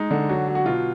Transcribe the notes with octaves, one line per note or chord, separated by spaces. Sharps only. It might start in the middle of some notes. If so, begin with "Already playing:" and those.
Already playing: G#3 D#4
D3
F#3 F#4
F#3
F#4
B2 F4